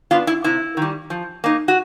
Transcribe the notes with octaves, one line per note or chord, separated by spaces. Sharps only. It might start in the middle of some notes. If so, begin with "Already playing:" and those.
B3 D4 F4
E4
C3 E4
D#3 G3
F3
A#3 D#4
F#4